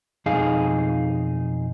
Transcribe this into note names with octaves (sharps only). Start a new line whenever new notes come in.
B1 F2 D#4 G#4 F5